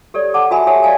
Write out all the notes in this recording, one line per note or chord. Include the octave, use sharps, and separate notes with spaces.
G4 A4 C#5 D5
A4 F#5 A5 D6
F#4 A#4 E5 G#5 B5
G4 A4 C#5 E5 G#5 A5
D5 D#5 F5 G#5 A5